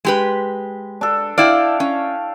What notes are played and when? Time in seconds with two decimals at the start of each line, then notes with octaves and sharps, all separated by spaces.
0.05 G#3 G4 B4
1.01 D4 A4
1.38 E4 D5 F5 G5
1.80 C#4